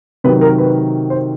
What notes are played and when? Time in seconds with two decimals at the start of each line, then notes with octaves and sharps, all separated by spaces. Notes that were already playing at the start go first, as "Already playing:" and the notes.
0.24 C3 D#3 F#3 B4
0.41 A#4
0.58 B4
1.10 C5